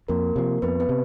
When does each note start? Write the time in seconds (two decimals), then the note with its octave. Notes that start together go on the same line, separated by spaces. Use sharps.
0.08 F2 A#3 A#4
0.36 C3 F3
0.62 F2 B3 B4
0.80 B3 B4
0.89 C3